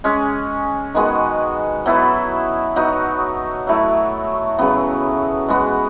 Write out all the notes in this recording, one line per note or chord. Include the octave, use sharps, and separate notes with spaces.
G#3 C#4 G#4
D#3 G#3 B3 F#4
F#3 B3 E4 A4
F#3 B3 D#4 F#4
F#3 A3 E4
C#3 F#3 B3
G#3 B3 F#4